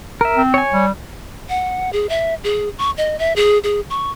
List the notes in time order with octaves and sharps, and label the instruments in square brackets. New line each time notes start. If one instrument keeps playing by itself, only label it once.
[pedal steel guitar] A#4 E5
[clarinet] C4
[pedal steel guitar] C#5 G#5
[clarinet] G3
[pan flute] F#5
G#4
E5
G#4
C#6
D#5
E5
G#4
G#4
C#6